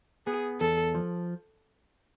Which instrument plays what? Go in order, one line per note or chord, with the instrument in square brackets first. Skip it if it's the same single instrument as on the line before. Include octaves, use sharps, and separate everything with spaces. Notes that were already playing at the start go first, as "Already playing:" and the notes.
[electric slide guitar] B3 [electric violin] G#4
[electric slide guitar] E2 [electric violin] A4
[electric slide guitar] F3